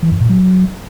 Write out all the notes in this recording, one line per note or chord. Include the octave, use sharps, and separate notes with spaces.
E3
F#2
A#2
F#3